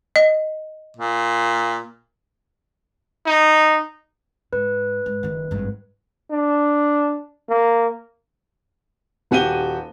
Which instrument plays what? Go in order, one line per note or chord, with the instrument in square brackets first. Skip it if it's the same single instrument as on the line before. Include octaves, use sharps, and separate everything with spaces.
[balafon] D#5
[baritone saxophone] A#2
[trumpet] D#4
[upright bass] G#2 [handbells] B4
[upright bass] G#2
F#1 D#3
G#1 G2
[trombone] D4
A#3
[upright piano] D#1 F#4 G4 D#7 G7